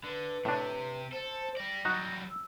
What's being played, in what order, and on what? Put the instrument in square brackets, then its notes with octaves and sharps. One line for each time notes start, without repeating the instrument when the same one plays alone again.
[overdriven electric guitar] D3 [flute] B4
[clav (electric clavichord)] A2 D4 [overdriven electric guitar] C3
[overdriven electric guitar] A4 [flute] C5
[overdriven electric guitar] G4 D5 [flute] A#6
[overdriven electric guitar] F#3 G3 [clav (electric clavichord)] D#4 F#4 F#5
[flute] E6